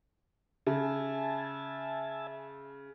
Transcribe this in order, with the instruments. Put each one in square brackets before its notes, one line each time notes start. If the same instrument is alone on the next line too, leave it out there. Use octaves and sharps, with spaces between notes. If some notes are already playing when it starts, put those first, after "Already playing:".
[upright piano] C#3 [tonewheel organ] E5 G#5 A5